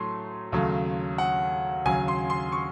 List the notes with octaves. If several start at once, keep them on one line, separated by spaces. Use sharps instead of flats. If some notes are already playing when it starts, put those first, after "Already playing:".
Already playing: A2 F#3 A3 C6
D#2 C#3 F#3 A3
F#5
D#2 C#3 F#3 G#5
C6
C6
C#6